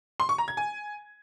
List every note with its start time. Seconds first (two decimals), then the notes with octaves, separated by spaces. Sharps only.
0.20 C6
0.29 C#6
0.38 A#5
0.48 G#6
0.57 G#5